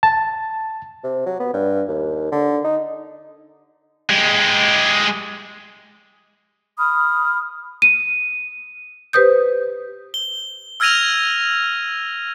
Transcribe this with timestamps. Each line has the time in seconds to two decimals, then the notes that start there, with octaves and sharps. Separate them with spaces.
0.03 A5
1.03 C3
1.26 F#3
1.40 B3
1.54 G2
1.88 D#2
2.32 D3
2.64 D#4
4.09 G#3 G4
6.78 B5 D#6 F6
7.82 D#7
9.13 G4 B4 C5 D#6 G6
10.14 G7
10.80 E6 F6 G#6 A#6 D#7 F7